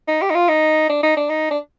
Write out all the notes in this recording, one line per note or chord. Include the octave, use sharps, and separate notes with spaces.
D#4
G4
D#4
F4
D#4
D4
D#4
D4
D#4
D4